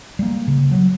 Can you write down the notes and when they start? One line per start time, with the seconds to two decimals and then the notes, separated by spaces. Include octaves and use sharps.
0.19 G3 A#3
0.48 C#3
0.71 F#3